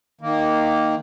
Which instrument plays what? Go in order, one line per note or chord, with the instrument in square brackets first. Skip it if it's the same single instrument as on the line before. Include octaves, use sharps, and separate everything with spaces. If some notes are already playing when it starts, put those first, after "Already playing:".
[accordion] D#3 A#3